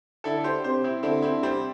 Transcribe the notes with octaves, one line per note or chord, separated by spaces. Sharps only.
D3 E4 A4
D5
G4 C5
C3 G4 C5
C4 E4
D3 C4 E4
C4 E4
C3 G3 C4